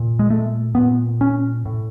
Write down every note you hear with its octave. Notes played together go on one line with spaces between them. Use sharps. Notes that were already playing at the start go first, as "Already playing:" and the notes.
Already playing: A#2
G#3
A3
A#2 B3
C#4
A2